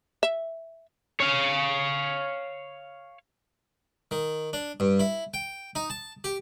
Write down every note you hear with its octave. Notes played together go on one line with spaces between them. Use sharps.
E5
C#5 F5
D#3
D4
G2
E4
G5
D#4
A5
G4